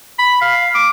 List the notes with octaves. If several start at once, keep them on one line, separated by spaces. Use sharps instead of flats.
B5
F5
D6